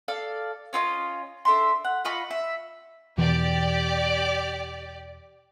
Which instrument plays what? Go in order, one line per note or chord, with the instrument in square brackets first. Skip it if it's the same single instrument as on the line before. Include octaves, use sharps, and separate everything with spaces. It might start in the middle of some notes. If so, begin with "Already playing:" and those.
[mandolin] A4 D5 F5
C#4 F4 A4 D#5
D4 A4 E5 C6
F#5
F4 D#5 B5 C#6
E5
[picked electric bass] E2 B2 E3 [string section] G4 D5